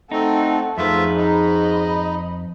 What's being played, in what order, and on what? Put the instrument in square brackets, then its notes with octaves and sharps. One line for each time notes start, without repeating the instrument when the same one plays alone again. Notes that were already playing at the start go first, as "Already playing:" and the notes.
[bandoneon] A3 C4 [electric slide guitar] D#4 [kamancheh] A4 F#5
[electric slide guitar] F2 B4 [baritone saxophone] G#2 [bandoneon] A3 F4 E5
[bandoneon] D#4 [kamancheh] D#5 B5